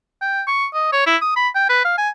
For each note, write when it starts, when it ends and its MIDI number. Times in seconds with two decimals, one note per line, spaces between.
0.22 0.42 79
0.48 0.66 85
0.74 0.90 75
0.93 1.06 73
1.06 1.17 64
1.22 1.32 87
1.36 1.49 83
1.56 1.69 79
1.69 1.82 71
1.85 1.96 77
1.98 2.09 80